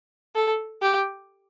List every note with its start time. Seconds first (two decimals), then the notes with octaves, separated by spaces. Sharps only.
0.35 A4
0.82 G4